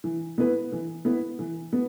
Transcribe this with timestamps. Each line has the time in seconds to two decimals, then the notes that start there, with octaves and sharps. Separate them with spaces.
0.04 E3
0.38 B3 E4 B4
0.72 E3
1.05 B3 E4 B4
1.39 E3
1.73 B3